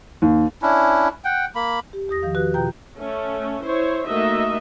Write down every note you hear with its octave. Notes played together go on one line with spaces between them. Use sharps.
D#2
C#4 D4 E4
F#5 G5
A#3 B5
G4
E2 G4 D#6 A#6
D#3 F3 F5
F#4 G4 B4 F#6
B2 F4 G5 A#5 G6
A3 C#4
E4 C5 C#5
A3 A#3 D#4 F#4 D#5 E5